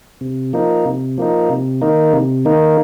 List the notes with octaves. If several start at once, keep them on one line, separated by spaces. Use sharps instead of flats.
C3
F3 A#3 D#4
C3
F3 A#3 D#4
C3
D#3 A#3 D#4
C3
D#3 A#3 D#4